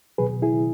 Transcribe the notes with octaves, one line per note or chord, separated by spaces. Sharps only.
B2 F#3 G#4 B4
E4 G#4